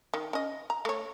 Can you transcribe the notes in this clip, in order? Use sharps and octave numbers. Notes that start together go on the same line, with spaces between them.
D#3
C#4 D#5
A#5
A3 C#5